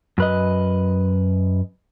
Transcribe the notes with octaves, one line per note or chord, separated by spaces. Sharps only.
F#2 B4 D#5